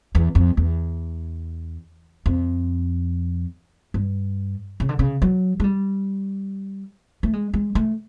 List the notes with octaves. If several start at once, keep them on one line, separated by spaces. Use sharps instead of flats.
E2
F2
E2
F2
G2
C#3
D3
C#3
F#3
G#3
G3
A3
G#3
G#3
A3